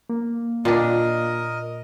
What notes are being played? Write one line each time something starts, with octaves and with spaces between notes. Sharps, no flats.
A#3
A#2 D4 F4 A#4 D#5 F5